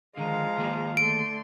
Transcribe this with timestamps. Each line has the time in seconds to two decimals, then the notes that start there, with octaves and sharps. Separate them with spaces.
0.17 D3 D#3 F3 G#3 F5 A#5
0.58 D#3 A#3 G#4
0.97 D3 A3 C6 D7